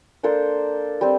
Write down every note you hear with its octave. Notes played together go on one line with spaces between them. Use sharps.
A#3 D4 A4 C5
G3 C4